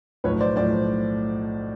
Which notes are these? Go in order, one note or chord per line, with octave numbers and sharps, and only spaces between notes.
B1 A2 F3 B4 C#5
C5 D5
B1 A2 F3 C5 D5